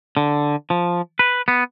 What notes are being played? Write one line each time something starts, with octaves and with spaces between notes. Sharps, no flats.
D3
F3
B4
B3